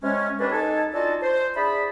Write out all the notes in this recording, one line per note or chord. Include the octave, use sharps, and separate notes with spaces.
C3 G#3 C#4
D#2 C#4 D4 B4
D#4 A4 G#5 A5
D4 D#4 F4 F#4 A4 A5
C5
D4 E4 G#4 A5 B5